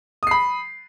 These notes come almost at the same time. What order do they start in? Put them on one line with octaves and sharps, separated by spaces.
D#6 C7 B5